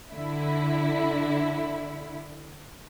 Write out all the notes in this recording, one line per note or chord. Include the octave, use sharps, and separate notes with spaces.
D3 E4